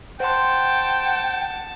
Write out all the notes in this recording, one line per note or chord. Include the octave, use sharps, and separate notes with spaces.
C5 F#5 G5 A5 C6